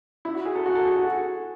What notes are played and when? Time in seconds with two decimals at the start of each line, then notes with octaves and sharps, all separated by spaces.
0.25 E4
0.35 F#4
0.45 G#4
0.55 A4
0.66 F#4
0.75 A4
0.85 G#4
0.96 F#4